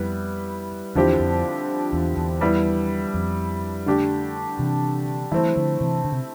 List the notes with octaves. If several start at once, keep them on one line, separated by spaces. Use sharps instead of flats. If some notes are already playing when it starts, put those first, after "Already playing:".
Already playing: F2 G3 B3 E4 B4
E2 D3 F3 C4 E4 G4
F2
E2
E2
G3 B3 E4
F2
D3 A3 D4 G4
C3 E3
E3 G3 A3 C4 E4
D3 F3
C3 E3
D3
C3